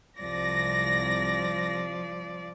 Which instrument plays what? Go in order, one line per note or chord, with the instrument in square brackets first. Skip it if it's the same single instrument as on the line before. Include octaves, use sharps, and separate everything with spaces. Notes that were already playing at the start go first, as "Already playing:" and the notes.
[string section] C2 A#6 [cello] F3 D5